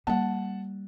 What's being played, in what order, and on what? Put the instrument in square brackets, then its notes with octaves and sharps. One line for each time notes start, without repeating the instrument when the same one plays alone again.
[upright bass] G3 [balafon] A#3 [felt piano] F#5 A5